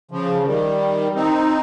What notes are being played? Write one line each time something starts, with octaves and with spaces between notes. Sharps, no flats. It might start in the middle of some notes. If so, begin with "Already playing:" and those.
C#3 F3
F3
D#3 G3
C4 D#4